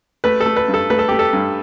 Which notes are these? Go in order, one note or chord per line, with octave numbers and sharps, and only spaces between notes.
A3 B4
A4
A3
B4
G2
A4
A3 B4
A4
A3 G4
A4
G2